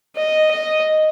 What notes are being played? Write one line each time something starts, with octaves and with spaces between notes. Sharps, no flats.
D#5
D#5